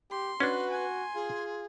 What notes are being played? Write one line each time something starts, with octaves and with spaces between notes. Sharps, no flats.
G4 C6
C#4 D4 F#4 B4
G#5 C6
F4 G#4